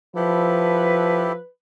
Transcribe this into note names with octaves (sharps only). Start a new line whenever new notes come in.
F3 E4 G4 A4 B4